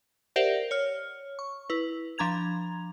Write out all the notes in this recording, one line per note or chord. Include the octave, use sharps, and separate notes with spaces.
G4 A#4 C5 D5 E5 F#5
C#5 F6
C#6
E4 B4
F3 D4 A#5 G#6 F7